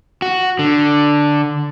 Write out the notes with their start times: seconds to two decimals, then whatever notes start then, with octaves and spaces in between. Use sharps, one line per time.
0.22 F#4
0.59 D3